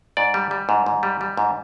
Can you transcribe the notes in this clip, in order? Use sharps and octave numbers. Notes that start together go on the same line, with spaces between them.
G#2 D5
G3
G3
G#2
G#2
G3
G3
G#2